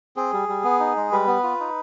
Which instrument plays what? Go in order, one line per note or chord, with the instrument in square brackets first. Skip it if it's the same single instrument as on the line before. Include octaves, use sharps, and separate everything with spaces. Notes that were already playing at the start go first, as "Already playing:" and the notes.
[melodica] C4 G#4
G3
G3
B3
D#4
G#3
G3 B4
B3
F4
D#4